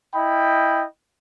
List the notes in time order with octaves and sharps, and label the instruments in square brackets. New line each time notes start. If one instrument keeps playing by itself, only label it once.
[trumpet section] E4 D#5 G5 B5